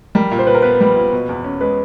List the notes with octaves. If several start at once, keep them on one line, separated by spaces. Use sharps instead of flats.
G3 A#4
A#2
C5
A#2 B4
A#4
B3 B4
G3
A#2
B2
E2
C#4
G#3 B4